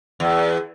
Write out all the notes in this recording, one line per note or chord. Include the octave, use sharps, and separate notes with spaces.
E2